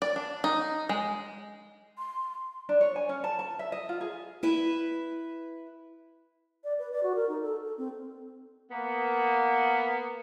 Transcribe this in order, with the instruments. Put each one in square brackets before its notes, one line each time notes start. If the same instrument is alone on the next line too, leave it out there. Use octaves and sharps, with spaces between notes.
[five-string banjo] D5
D4
D#4
G#3
[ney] C6
[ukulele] D4
C#5
G#5
C#4
A5
A5
E5
D#5
F4
G#4
[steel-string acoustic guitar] E4 B4 E5
[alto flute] D5
B4
D5
F#4
A#4
D#4
A4
A4
C4
[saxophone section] A#3 B3